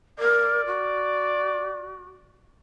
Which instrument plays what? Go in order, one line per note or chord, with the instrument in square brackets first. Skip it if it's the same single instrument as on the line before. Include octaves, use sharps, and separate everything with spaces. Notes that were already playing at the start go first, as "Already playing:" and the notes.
[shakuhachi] A#4 [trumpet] D5
[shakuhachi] F#4